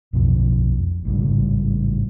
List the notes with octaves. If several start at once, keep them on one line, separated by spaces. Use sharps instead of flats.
B1 F2 B2 F3
A1 G#2 C#3 G3